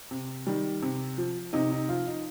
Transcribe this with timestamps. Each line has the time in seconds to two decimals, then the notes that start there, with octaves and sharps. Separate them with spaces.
0.11 C3
0.47 D#3 G3
0.82 C3
1.18 F3
1.53 C3 D#4
1.72 D#4
1.88 F3 F4
2.07 D#4